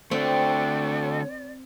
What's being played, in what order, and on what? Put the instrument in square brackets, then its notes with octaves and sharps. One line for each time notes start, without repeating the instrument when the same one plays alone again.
[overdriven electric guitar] D3 A3 [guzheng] C4 [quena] D5